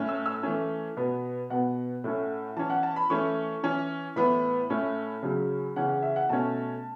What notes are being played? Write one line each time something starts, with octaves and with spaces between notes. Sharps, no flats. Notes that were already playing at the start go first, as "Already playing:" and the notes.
Already playing: A2 A3 C#4
E6
E6
E3 A3 C#4
B2 B3
B2 B3 F#5
A2 A3 C#4
E3 C#4 A5
F#5
A5
B5
E3 A3 C#4 C#6
E3 C#4
A2 E3 B3 B5
A2 A3 C#4
C#3 F#3 C#4
C#3 E3 C#4 F#5
F#5
E5
F#5
B2 A3 C#4 A5